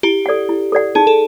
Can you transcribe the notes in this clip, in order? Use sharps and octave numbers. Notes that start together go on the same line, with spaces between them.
E4 G4
A4 D5 F#5
E4
A4 D5 F#5
D#4 G#4
A4